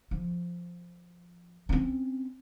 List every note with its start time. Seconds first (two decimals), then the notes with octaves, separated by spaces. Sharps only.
0.11 F3
1.69 C4 C#4